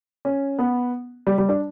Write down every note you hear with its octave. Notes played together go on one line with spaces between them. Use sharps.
C#4
B3
G3
G3
D4